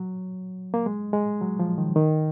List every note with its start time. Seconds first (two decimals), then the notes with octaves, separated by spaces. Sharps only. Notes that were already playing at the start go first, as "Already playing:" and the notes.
Already playing: F#3
0.74 A#3
0.86 G#3
1.13 G#3
1.41 F#3
1.59 F3
1.78 D#3
1.96 D#3